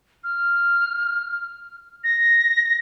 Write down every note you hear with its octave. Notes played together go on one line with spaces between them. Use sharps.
F6
A#6